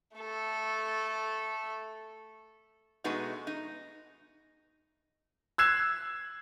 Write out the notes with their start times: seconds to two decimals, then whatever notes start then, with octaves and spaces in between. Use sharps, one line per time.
0.17 A3 A4
3.04 B2 G#3 A3 B3 D#4 F#4
3.47 D#4
5.58 E6 F#6 G#6 C7 E7